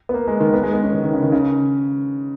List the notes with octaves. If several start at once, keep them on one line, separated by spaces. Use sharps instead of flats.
B3
A#3
G#3
D#3
B3
G#3
B3
C#4
D#3
D#3
C#3
D#3
C#3